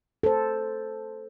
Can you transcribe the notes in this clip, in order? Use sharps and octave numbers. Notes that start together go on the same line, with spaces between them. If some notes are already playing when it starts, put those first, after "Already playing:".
A4 C5